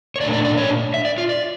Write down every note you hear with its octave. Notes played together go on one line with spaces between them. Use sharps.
C#5
A#2 A3 D4 D5
D5
D5
C#5
E5
D5
F4
D5